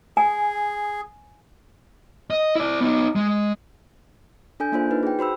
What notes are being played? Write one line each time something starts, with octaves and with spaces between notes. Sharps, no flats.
G#4 G#5
D#5
E4 D5
B3 D#4
G#3
D4 A4 G#5 G6
A#3 D4 F4 C5
D#4 B4
G#4 G5
F#4 C5 B5 E6